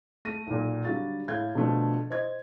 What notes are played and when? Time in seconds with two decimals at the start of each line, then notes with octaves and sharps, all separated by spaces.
0.25 A3 A#6 D#7
0.47 B1 A#2
0.85 D3 F#3 G3 F#4 F5 A6
1.28 A2 F5 G6 G#6
1.55 B2 D3 F3 A3 D4
2.10 C5 D#5 G#6